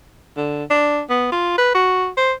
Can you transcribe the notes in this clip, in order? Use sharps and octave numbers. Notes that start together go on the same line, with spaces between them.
D3
D4
B3
F4
B4
F#4
C5